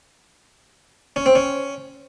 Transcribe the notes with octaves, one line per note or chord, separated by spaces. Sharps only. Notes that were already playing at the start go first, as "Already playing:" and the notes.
C#4
C4
C#4